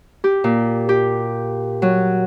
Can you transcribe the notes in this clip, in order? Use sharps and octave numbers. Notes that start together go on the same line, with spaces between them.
G4
A#2
G4
F#3